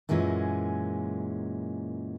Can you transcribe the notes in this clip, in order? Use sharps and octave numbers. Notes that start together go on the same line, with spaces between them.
F#2 A#2 E3 G#3 C#4